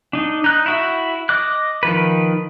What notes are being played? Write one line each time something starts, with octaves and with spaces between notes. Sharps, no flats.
D4 D#4
D#4 F#6
E4 F#4 E5
D#5 D6 F#6
D#3 F3 B4